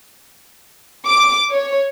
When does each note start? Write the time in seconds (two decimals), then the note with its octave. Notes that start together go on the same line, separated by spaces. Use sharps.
1.07 D6
1.51 C#5